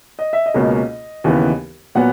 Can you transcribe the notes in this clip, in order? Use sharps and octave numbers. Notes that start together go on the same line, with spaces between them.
D#5
E5
D#5
C#2 B2 A#3 C#4
D#2 C#3 E3 B3
A#2 F#3 B3 F#5